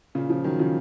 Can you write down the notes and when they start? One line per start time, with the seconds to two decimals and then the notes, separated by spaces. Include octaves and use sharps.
0.15 A#2 C#3
0.29 C#3 F3
0.44 D#3 F#3
0.59 C#3 F3